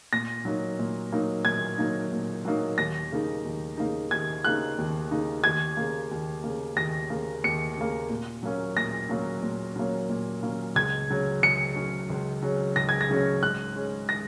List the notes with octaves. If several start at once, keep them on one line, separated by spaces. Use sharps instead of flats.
A#2 A#6
F#3 A#3 D#4
A#2
F#3 A#3 D#4
A#2 G#6
F#3 A#3 D#4
A#2
F#3 A#3 D#4
D#2 A#6
C#3 A#3 D#4
D#2
C#3 A#3 D#4
D#2 G#6
C#3 A#3 D#4 F#6
D#2
C#3 A#3 D#4
D#2 G#6
C#3 A#3
D#2
C#3 A#3
D#2 A#6
C#3 A#3
D#2 C#7
C#3 A#3
A#2
F#3 A#3 C#4
A#2 A#6
F#3 A#3 C#4
A#2
F#3 A#3 C#4
A#2
F#3 A#3 C#4
C#2 G#6
C#3 F#3 C#4
C#2 C#7
C#3 F#3 C#4
C#2
C#3 F#3 C#4
C#2 A#6
G#6
A#6
C#3 F#3 C#4
G#2 F#6
G#3 C#4
A#6